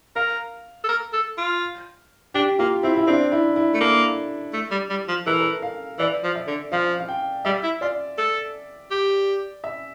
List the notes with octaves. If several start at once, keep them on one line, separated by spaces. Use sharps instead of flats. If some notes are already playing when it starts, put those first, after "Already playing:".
A#4 F5
A4
A#4
A4
F4
D4 G4
A#3 F4
C4 E4
E4
C4 D4
E4
E4
A3
A#3 A4
A3
G3
G3
F3
E3 A#4
A4
A#4
F5
E3 D5
F3
E5
D3
F3 F5
F5
G5
G3 E5
E4
F4 D5
A4
G4
E5